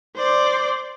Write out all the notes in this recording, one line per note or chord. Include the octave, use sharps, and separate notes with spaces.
C5 D5